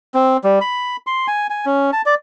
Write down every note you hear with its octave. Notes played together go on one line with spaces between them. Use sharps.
C4
G3
B5
C6
G#5
G#5
C#4
A5
D5